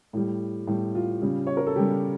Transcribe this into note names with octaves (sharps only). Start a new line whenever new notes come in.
A2 G3
A2 G3
F4
C#3 G3
C#5
A#4
A4
C#3 G3 G4